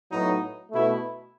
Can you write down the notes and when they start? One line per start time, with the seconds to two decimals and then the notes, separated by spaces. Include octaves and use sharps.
0.10 A2 F#3 B3 D#4
0.71 B2 A3 E4